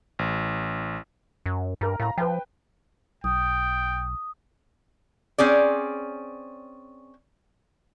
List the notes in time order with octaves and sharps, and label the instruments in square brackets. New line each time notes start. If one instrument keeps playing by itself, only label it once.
[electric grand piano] A1
[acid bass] F#2
[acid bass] G2 [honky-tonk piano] A#4 A#5
[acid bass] A2 [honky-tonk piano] F5 A#5
[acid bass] F3 [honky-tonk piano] B4 G5
[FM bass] B1 [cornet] G5 [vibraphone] D#6
[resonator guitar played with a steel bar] C4 C#4 G#4 D5